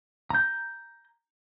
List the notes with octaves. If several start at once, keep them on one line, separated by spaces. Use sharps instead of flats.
A#5 G6